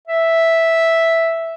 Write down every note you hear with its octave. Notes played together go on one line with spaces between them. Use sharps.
E5